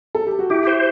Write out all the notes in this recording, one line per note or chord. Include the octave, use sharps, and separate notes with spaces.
A4
G4
F#4
E4 G4
C5